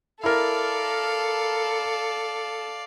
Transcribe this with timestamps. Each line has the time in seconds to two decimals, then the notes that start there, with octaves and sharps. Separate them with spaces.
0.24 E4 A4 A#4 D5 F5